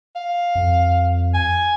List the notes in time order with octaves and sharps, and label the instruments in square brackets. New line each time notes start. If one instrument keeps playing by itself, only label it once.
[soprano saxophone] F5
[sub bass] F2
[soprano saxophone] G#5